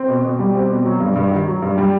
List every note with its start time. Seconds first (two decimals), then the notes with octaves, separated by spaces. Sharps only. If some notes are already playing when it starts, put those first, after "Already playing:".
Already playing: C4
0.08 B2
0.24 B2
0.39 G3
0.55 C4
0.70 B2
0.85 F#3
1.00 G2
1.16 G2
1.32 D#3
1.47 F#3
1.62 G2
1.78 G3